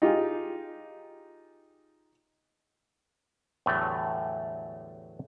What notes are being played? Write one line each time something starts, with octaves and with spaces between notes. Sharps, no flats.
D#4 F4 G4 G#4
E2 A2 D3 F#3 G3 A3